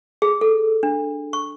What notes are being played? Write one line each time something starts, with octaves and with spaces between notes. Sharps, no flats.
G#4
A4
D4
C#6